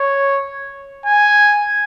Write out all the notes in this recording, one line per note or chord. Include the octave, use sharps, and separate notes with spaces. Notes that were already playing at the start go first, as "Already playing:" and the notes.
Already playing: C#5
G#5